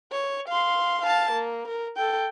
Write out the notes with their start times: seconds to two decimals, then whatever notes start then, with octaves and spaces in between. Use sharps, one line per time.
0.12 C#5
0.48 F5 C6
1.01 F5 A5
1.31 A#3
1.68 A#4
1.97 A4 G5